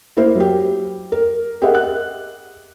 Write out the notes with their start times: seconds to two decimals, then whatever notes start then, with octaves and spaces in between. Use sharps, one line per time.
0.17 A#3 E4 A#4 C5
0.36 F#3 G4
1.12 A#4
1.62 G4 G#4 A#4 D#5 E5 F#5
1.75 F#6